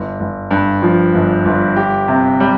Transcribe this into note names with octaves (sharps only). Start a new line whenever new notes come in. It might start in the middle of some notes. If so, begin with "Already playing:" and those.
Already playing: G1
G1
G2
F3
G1
G1
G4
C3
G3